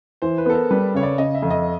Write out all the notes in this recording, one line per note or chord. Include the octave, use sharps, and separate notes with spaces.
E3 C5
B4
B3 A4
A#4
G3 B4
C#3 C#5
D5
C#3 D#5
E5
F2
D#5